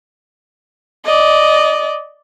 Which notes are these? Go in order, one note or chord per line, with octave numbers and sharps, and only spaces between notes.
D5 D#5